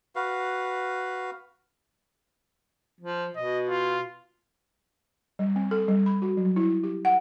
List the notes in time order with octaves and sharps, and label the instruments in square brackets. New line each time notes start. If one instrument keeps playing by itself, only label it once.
[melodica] F#4 B4 F5
[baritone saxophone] F3
[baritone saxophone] B2 [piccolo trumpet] D#5
[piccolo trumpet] F4
[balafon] G3
C4
A4
G3
B5
F#4
F#3
E4
G4
F#5